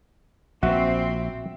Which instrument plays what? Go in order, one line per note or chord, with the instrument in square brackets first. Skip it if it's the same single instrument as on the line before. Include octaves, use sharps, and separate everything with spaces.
[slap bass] A#1 [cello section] C4 [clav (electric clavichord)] F#4 [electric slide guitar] E5